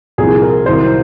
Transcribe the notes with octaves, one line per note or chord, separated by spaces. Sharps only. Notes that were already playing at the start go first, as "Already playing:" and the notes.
C2 A#2 F3 G#4
A#4
C2 C3 D#3 F#3 C5